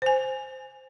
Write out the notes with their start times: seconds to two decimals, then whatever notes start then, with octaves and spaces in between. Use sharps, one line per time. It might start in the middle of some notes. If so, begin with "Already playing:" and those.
0.02 C5 G#5